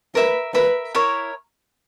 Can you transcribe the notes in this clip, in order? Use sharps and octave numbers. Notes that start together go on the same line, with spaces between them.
A#4 B4 E5 B5
A#4 B4 E5 B5
E4 A#4 C#5